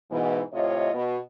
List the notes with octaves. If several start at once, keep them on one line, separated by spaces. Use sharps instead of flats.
G#2 B2 E3
A2 C3 F4 C#5 D#5
B2